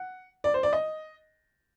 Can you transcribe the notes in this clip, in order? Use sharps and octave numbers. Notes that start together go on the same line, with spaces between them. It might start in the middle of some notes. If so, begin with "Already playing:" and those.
Already playing: F#5
D5
C5
D5
D#5